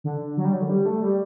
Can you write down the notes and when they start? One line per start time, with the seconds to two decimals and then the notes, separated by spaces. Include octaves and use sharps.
0.04 D3
0.37 F#3
0.45 G3
0.53 F#3
0.61 D3
0.69 G3
0.85 A3
1.02 G3